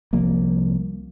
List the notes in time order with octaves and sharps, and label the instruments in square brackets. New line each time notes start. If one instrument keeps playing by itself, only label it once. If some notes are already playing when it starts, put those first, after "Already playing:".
[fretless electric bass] C2 F3 A#3